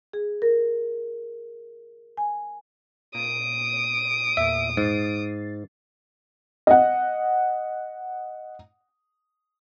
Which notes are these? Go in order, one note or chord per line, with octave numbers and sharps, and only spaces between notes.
G#4
A#4
G#5
A#2 D#6 D7
E2 A#2 E5
G#2 A6 C7
D#5 F#5